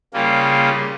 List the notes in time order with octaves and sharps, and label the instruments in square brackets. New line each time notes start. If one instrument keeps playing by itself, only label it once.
[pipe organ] C#3 G3 A#3 F4